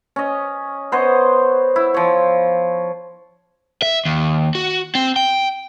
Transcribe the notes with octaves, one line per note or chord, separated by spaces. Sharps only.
C#4 D#5
B3 C5 C#5 D#5
E4
F3 C#5
E5
D#2
F#4
C4
G5